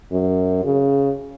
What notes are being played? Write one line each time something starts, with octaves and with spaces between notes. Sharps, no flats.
F#2
C#3